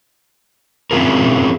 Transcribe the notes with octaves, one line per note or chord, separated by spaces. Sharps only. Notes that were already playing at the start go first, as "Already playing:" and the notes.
C4 C#4 E4 F4 G#4 A#4